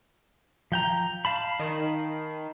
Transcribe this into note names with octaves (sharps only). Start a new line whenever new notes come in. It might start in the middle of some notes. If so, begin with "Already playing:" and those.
F3 G5 A#5
F5 A5 B5
D#3